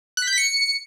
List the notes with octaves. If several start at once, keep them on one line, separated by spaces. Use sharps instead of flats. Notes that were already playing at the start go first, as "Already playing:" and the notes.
F#6
B6
G6
B6
C#7